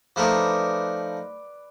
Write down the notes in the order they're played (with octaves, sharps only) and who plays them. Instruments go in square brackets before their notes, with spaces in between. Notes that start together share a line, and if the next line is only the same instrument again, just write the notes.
[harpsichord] F3 A3 D#4 [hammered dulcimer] B4 D5